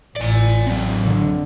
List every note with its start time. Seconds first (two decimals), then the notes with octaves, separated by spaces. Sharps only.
0.17 A1 A2 D5 G#5
0.67 F#3 C4
1.04 D3